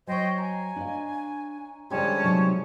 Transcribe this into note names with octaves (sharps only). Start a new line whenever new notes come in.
F#3 C5 C#5 D#5 G5 G#5
G#5 A#5
D4 D#5 F5
D3 F3 G3 G#3 C#4 G4 A5
C3 F#3 D#4 C#5